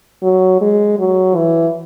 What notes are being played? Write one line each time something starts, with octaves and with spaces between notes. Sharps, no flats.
F#3
G#3
F#3
E3